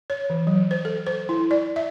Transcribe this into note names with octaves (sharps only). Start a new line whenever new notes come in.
C#5
E3
F#3
C5
A4
C5
E4
D5
E5